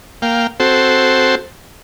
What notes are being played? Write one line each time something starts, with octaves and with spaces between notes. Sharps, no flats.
A#3 F5 G5
C4 F#4 A4 C5